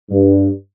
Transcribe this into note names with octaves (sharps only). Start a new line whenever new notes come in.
G2